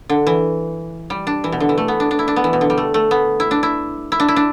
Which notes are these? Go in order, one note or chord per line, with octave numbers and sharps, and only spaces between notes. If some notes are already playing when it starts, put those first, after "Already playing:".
D3
E3
G3
D4
E3
B2
D3
E3
A3
B3
D4
D4
E4
D4
B3
E3
B2
D3
G3
A3
A3
B3
E4
D4
E4
E4
D4
E4
D4